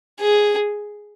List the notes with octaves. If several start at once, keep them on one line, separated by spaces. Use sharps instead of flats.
G#4